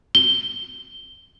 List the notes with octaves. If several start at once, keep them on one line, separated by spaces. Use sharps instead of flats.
G7